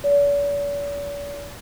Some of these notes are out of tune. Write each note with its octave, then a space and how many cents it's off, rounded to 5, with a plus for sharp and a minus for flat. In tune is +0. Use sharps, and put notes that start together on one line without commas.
D5 -45